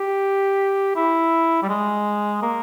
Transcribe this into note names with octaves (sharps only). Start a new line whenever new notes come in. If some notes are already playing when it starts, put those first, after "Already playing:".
Already playing: G4
E4
G3
G#3
A#3